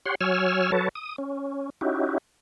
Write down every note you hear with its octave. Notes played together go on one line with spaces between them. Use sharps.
G4 C#5 F#5 C6
F#3 C#5 G#5 E6 F6
F#3 A4 B4 C#5 A5
D#6
C#4
C#4 D#4 E4 F#4 G4